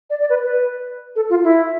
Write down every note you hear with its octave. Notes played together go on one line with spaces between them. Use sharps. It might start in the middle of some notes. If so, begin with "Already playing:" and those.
D5
D5
B4
B4
A4
F4
E4